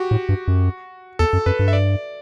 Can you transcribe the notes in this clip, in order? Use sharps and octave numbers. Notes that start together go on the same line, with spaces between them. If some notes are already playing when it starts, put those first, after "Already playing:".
Already playing: F#4 G4
A2
G2
F#2
E2 A4
F#2
F#2 B4
G2
E5
D5